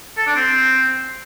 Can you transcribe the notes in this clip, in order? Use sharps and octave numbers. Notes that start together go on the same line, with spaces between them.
A4
D4
C4